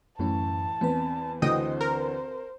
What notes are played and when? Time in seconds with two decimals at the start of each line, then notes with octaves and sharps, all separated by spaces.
0.19 F#2 A2 E3 C#4 A5
0.81 E2 C4 B4
1.42 D2 D3 E3 C5 D#5 G5 D#6
1.81 A#4